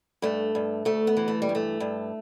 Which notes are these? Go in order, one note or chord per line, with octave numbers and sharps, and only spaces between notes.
G2 A3
G2
D2 A3
B3
E3
A3
G3
G2
A3
G2